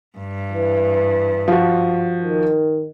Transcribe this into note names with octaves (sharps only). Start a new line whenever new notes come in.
G2
E3
F3 F#4
D#3